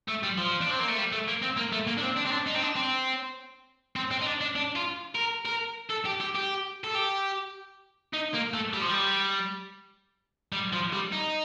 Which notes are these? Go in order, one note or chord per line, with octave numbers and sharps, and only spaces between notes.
A3
G3
F3
D4
C4
A#3
A3
G3
A3
A#3
C4
A#3
A3
A#3
D4
C4
D4
C4
D4
D#4
C4
D4
C4
C4
C4
D#4
D4
D4
D4
F4
A#4
A#4
A4
G4
G4
G4
A4
G4
D#4
A#3
A3
G3
F3
G3
G3
F3
G3
D#4